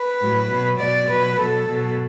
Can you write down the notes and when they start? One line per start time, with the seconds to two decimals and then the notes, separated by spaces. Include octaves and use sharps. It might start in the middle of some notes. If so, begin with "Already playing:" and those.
Already playing: B4
0.20 A2 F#3
0.50 B2 F#3
0.79 B2 F#3 D5
1.09 B2 F#3 B4
1.39 B2 F#3 A4
1.69 B2 F#3